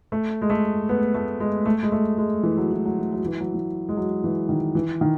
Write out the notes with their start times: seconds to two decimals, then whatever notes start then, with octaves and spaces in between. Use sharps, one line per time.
0.12 A3
0.42 G#3
0.50 A3
0.89 B3
1.14 A3
1.40 G#3
1.66 A3
1.83 G#3
1.92 A3
2.18 G#3
2.43 E3
2.57 F#3
2.71 E3
2.85 F#3
2.98 E3
3.13 F#3
3.26 E3
3.40 F#3
3.54 E3
3.89 G#3
3.97 F#3
4.24 E3
4.49 D#3
4.75 E3
5.01 D#3